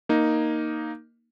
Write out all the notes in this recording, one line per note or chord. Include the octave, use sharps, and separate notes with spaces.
A#3 D#4